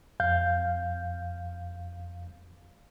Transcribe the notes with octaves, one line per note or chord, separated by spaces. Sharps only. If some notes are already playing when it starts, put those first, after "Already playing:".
F2 F5 G6